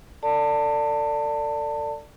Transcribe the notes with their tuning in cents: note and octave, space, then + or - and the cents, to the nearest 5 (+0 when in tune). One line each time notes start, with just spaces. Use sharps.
A4 +35 D5 +0 A5 +25